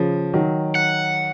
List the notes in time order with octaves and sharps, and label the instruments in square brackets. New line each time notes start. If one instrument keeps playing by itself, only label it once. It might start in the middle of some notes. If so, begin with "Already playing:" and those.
Already playing: [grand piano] C#3 F3
D#3 F#3
[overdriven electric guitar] F#5